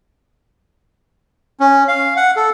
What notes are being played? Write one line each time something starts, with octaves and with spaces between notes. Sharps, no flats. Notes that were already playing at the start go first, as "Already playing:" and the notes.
C#4
F5
F#5
A4